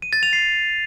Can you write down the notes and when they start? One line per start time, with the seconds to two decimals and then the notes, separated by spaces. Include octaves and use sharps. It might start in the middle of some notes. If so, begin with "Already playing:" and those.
0.02 D#7
0.13 A6
0.23 F7
0.33 C7